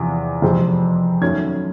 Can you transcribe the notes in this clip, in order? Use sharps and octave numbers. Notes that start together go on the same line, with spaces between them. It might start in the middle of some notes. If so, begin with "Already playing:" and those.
Already playing: E2 C3 F3
F2 C3 E3 G#3 C4
F#2 D#3 F#3 A3 C#4 G#6